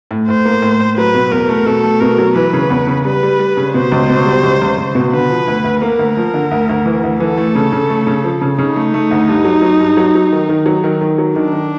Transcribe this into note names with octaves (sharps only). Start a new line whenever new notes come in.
A2
A2 C5
A#3
A2
A2
F#3 B4
B2
E2 A#4
A3
B2 A4
A3
B2 A#4
F#3
E3 B4
C#3
E2
C#3
G3 B4
G3
G3
C#3
B2 C5
C#2
B2
G3
C#2
C#2
C#2
B2
D3 B4
F3
D2
D2
A#3 A#4
D2
F3
D3
D2
D2
E3
D2
E3 A4
A3
C#3
C#3
A3
C#3
F3
C#3
C#3 D#4
A3
A3
D2
G2
F#3
F#3
G2
F#3
F#3
D#3
D#3
F#3
D#3
D#3
F#3
D#3 D4
D#3